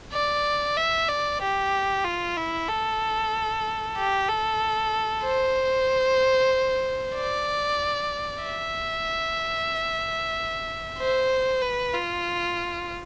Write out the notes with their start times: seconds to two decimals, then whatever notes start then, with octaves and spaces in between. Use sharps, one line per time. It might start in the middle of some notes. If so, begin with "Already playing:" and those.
0.13 D5
0.77 E5
1.09 D5
1.41 G4
2.04 F4
2.37 E4
2.68 A4
3.97 G4
4.28 A4
5.23 C5
7.15 D5
8.42 E5
10.98 C5
11.62 B4
11.94 F4